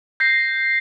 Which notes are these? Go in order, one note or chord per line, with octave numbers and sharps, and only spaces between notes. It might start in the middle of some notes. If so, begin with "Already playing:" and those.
G6 A#6 C7